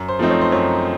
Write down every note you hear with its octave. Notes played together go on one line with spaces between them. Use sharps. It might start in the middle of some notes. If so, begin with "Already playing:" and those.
Already playing: F#2
C5
F3 A3 C4 D#4
C#5
C5
F#2 C#5